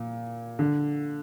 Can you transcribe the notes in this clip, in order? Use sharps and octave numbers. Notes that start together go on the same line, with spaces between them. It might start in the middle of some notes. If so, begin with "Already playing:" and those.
Already playing: A#2
D3